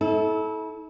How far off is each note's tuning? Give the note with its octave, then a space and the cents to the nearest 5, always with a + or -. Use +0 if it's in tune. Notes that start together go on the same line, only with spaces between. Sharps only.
E4 -35 A4 -20